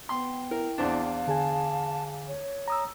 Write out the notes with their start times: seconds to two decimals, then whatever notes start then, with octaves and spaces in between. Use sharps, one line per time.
0.09 B3 G5 C6
0.51 E4 A#4
0.78 E2 C4 D4 F5
1.27 D3 G#4 G#5 A5
2.28 C#5
2.68 A#5 D#6 E6